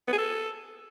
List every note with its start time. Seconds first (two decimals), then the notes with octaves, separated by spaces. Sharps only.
0.08 B3
0.13 G#4
0.18 A4